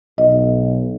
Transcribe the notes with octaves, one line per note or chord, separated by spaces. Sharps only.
B1 D#5